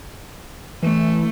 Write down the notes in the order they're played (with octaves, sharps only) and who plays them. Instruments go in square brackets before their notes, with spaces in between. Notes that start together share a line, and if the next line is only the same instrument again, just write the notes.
[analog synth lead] E3 [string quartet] A3